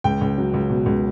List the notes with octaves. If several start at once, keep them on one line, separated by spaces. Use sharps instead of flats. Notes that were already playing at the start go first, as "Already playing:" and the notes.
C#2 G5
C#2
F#3
C#2
B2
C#2